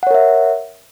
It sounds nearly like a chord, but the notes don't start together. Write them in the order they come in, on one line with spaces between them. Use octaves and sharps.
F#5 C#5 A#4 E5